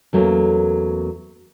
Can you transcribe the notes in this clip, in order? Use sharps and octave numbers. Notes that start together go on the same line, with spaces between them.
E2 F#3 A3 A#3 C#4